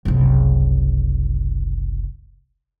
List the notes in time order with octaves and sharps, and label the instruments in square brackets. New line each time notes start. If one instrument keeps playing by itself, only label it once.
[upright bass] F#1 C2